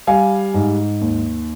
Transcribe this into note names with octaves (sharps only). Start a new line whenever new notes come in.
G3 F5 G#5
G#2
D#2